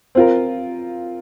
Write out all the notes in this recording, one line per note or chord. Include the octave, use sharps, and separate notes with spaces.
C4 F4 A#4